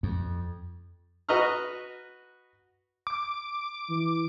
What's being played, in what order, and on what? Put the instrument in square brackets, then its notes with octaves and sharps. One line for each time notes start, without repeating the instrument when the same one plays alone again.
[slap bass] F2
[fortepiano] F#4 B4 D#5 A#5 C#6 F6
[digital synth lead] D6
[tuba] E3